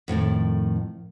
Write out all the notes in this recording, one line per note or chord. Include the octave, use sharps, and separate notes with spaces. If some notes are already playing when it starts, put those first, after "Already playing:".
F2 A2 D3 D#3